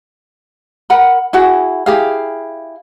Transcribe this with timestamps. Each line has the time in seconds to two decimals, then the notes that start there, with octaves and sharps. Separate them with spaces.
0.90 A#4 F#5 B5
1.33 E4 F#4 G#4
1.86 E4 G4 G#4 F5